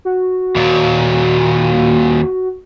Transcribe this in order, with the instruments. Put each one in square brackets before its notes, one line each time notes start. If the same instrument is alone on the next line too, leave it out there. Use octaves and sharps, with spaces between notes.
[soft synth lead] F#4
[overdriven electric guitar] D#2 A#2